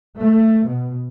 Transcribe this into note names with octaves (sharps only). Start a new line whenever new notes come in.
A3
B2